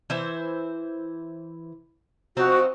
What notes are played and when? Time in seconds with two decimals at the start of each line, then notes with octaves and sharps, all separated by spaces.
0.10 E3 C5 E5
2.37 F3 C4 D#4 F#4